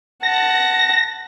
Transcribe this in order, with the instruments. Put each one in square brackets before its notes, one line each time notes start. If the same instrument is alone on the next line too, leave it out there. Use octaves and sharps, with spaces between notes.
[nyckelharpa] F#5 A5 [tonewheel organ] A#6